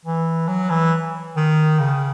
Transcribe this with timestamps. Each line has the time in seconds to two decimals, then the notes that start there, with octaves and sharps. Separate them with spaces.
0.05 E3
0.48 F#3
0.70 E3
1.36 D#3
1.79 C#3